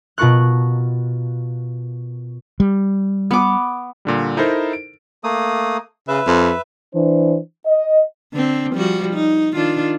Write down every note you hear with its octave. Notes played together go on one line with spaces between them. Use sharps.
B2 F4 A#4 C#6 F#6
G3
B3 D6
A#2 D3 G3
D#4 E4 A4 A#4 C5
D7
A3 A#3 D#6
C#3 B4 E5
F2
E3 D4 C5
D#5
D3 C4
F3 G3 F#4
D#4
D#3 D4 F4